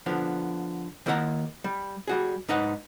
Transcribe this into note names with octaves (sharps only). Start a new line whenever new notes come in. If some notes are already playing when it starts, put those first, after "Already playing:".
D3 F3 B3
D#3 A#3 E4 A#4 F#5 A#5
G3
G3 F#4 G#4
G#2 D#4 B4 F#5